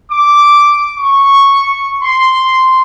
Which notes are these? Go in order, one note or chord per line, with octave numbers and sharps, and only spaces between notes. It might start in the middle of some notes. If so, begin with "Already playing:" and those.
D6
C#6
C6